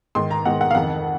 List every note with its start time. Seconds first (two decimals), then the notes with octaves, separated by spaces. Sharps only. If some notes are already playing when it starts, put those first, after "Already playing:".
0.15 G#2 D#3 C6
0.31 A#5
0.45 G#2 D#3 F#5
0.61 F#5
0.70 F5
0.75 F2 D#3 F#5